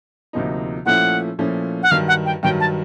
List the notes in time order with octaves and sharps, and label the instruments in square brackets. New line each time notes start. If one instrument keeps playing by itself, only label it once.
[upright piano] D2 C3 F3 A#3 D#4
[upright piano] A#2 F3 A3 C#4 E4 [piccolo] F#5
[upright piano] A#2 F3 A3 C#4 E4
[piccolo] F#5
[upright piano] G2 D#3 F#3 [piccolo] F5
[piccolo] F#5
G5
[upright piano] G2 D#3 F#3 [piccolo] G5
[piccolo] A5